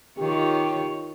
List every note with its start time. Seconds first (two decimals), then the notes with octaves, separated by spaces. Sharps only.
0.18 D#3 F4 G4 C#5